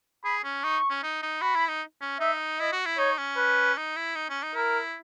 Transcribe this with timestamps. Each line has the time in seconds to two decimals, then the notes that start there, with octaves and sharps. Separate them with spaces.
0.24 G#4 B5
0.44 C#4
0.64 D#4 C#6
0.90 C#4
1.03 D#4
1.22 D#4
1.42 F#4 B5
1.55 E4
1.68 D#4
2.01 C#4
2.20 D#4 E5
2.60 E4 D#5
2.72 F#4
2.86 E4
2.98 D#4 C#5
3.18 C#4
3.37 B4
3.77 D#4
3.97 E4
4.16 D#4
4.29 C#4
4.43 D#4
4.55 E4 A#4